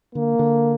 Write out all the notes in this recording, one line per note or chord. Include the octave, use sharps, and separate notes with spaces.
D3 A#3
D3